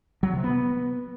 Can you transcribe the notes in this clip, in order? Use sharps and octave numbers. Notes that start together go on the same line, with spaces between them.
F#3
C3
B3